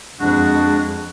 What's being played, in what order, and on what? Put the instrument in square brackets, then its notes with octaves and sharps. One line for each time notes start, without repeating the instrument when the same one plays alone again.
[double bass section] F2 [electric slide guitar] G#3 [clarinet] D4 [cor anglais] F#4